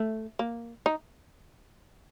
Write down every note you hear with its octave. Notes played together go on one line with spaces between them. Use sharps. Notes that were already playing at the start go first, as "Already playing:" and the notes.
Already playing: A3
A#3
D#4